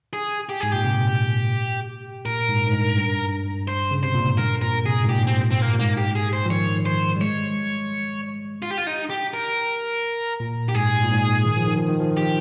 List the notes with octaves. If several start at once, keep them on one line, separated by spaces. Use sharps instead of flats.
G#4
G4
G#2 G#4
A#2 G4
C3
A#2 A#4
G#2
G#2
G2
G2
C5
C#3
C3 C5
A#2
G#2
G2 A#4
A#2 A#4
C3 G#4
G#2
A#2 G4
C4
C4
A#3
A#2
G#2 A#3
G4
G#4
C5
F3
D#3 C#5
C5
G3
G#3 C#5
F4
G4
F4
D#4
G4
A#4
A#2
G4
G#2 G#4
A#2
G#2
D#3
F3
D#3
F3
D#3
F3
D#3
F3 G4